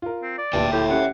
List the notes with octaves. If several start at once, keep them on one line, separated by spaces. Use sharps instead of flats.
F4 A#4
C4
D5
D1 G2 A#2 E5 G5 A5
A2 G4
C#4 G4 F#5